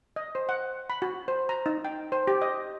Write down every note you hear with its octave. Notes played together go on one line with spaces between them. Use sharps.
D#5
C5
F#5
B5
F#4
C5
A#5
D#4
G5
C5
G4
D#5